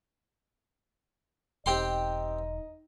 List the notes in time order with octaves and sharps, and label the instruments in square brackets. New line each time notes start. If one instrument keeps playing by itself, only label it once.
[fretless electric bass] E1 [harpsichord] C4 G4 C6 [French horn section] D#4 D#5